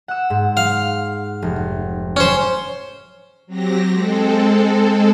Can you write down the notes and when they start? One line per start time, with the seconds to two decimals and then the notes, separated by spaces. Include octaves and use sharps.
0.08 F#5 E6
0.30 G#2
0.57 F5
1.42 F1
2.16 C#4 C5
3.47 F#3 C4 G4 A#6
3.91 G#3 C4 A4